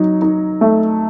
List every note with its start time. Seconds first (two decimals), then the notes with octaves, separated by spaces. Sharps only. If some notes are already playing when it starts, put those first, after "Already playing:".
Already playing: F#3 D#4
0.22 D#4
0.61 A3